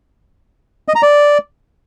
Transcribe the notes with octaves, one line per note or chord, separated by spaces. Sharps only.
D#5
A#5
D5